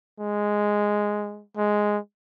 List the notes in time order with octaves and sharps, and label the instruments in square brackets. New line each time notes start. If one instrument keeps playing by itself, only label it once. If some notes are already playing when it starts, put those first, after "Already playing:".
[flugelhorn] G#3
G#3